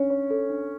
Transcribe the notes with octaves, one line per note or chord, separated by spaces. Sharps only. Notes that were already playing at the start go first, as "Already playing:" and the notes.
Already playing: C#4 D4 C#5
C#5
A4
D4